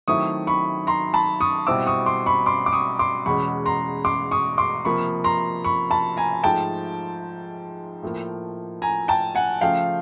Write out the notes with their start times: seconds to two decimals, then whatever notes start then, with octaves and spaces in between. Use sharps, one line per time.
0.08 D#3 F#3 A3 C4 E4 C#6 D#6
0.47 B5 C#6
0.87 A#5 C6
1.14 A5 B5
1.41 C#6 D#6
1.67 B2 G3 C4 E4 D6 E6
1.87 C#6 D#6
2.06 C6 D6
2.26 B5 C#6
2.46 C6 D6
2.66 D6
2.72 C#6 D#6
2.99 C6 D6
3.26 E2 B2 G#3 C#4 B5 C#6
3.66 A#5 C6
4.05 C6 D6
4.31 C#6 D#6
4.58 C6 D6
4.85 C3 F3 A#3 B5 C#6
5.24 A#5 C6
5.64 B5 C#6
5.90 A5 B5
6.17 G#5 A#5
6.44 G#2 F3 A3 G5 A5
8.03 A2 F3 A#3
8.82 G#5 A#5
9.08 G5 A5
9.35 F#5 G#5
9.61 C#3 F3 A3 F5 G5